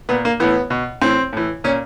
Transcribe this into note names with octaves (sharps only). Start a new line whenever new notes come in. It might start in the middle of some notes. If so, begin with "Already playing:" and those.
A#2 B3
A#3
A2 E3 B3
B2
A2 E3 C4
A2 E3
A#2 C#4